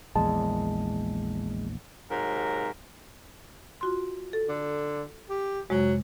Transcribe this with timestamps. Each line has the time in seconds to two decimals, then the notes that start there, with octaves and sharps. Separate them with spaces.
0.16 A#1 E2 G#3 A5
2.10 G#2 C3 F#3 A#4 A#5
3.81 F4 F#4 C6
4.33 A4
4.48 D3
5.29 G4
5.70 F2 C3 F#3 G#3